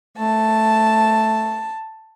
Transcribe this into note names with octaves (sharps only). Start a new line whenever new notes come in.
A3 A5